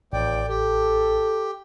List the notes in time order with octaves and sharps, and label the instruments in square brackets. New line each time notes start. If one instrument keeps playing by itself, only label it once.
[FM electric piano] A1 [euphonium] D#2 [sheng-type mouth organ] D5 G5
[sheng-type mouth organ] G4 [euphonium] A4